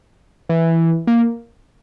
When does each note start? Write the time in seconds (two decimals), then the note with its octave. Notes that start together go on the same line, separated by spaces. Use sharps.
0.49 E3
1.07 A#3